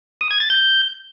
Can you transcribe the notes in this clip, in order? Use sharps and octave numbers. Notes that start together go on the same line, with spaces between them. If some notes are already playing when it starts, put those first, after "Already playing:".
D#6
G#6
A6
G6